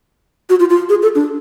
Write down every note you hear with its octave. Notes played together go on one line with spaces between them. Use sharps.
F#4
F4
F4
G#4
A4
D4